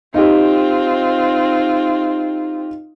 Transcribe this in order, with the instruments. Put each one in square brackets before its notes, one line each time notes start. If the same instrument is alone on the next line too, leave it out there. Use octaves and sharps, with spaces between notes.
[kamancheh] C4 F4 [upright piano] D#4 G4